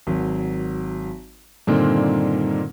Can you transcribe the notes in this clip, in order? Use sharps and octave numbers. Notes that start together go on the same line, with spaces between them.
G#1 F#3
G2 A#2 D3 D#3 A#3 C4